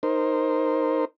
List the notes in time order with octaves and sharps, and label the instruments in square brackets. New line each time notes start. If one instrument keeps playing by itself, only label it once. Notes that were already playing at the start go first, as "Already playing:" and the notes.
[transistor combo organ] D#4 A#4 C5